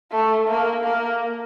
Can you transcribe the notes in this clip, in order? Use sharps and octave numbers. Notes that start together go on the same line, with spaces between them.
A3
A#3
A#3